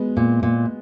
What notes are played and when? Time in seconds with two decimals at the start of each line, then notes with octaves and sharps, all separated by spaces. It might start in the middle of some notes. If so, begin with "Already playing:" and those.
Already playing: G#3 B3
0.17 A#2
0.43 A#2